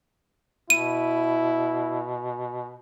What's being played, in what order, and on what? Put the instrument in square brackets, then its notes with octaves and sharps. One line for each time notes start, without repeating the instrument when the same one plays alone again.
[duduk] B2 [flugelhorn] E4 [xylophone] D#7